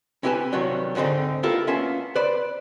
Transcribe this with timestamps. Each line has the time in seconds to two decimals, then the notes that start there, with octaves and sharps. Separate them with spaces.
0.23 C4 E4 G4 B4 G#5 A5
0.52 G2 C3 D#3 E3 F#3 G3
0.95 D2 G#2 D3 C4 D#4
1.43 B3 E4 F4 G4 A4 A#4
1.67 A#3 B3 C#4 F4 E5 A5
2.15 B4 C5 D5 B5